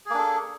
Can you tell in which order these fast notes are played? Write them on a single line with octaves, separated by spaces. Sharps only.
G#4 A#3 D4 A4